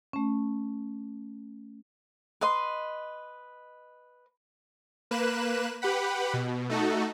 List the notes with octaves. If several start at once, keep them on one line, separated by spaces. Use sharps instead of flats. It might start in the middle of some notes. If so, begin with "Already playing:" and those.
A3 C#4
B4 D#5 C6
A#3 B4 F#6 E7
G4 B4 F#5 B5
B2
A3 D#4 F#4 A4